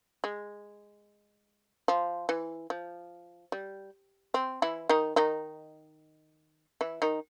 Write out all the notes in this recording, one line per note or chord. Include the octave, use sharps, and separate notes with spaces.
G#3
F3
E3
F3
G3
C4
E3 E4
D#3 D#4
D#3 D#4
E3 E4
D#3 D#4